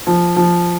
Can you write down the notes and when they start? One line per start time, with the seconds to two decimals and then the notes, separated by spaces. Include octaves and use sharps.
0.07 F3
0.36 F3